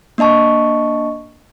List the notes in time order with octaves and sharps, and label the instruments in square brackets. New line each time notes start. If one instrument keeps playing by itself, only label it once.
[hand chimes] A#3 D4 D#5 A5 C#6